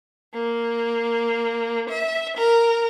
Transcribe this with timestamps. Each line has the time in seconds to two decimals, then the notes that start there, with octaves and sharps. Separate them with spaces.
0.34 A#3
1.89 E5
2.38 A#4